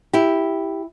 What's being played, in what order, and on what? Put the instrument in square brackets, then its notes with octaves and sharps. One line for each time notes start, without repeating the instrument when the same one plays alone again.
[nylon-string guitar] E4 G4